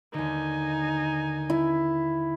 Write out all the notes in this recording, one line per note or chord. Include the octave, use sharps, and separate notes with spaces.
D#2 D3 D#4 G#5
E4